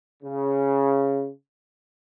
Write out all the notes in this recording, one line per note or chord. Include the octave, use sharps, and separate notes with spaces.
C#3